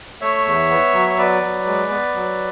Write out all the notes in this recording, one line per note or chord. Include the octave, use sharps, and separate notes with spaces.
A3 C#5 E5
E2
B3
F#3
C#5
B3 B4 D5
F#3
G#3
B3
F#3